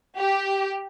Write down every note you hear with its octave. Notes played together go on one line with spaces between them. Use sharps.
G4